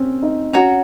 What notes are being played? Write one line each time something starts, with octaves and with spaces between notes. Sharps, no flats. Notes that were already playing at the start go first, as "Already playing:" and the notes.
Already playing: C4 C#4
D#4
C#4 F#4 C#5 F#5 A#5